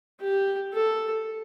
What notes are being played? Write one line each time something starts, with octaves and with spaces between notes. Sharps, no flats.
G4
A4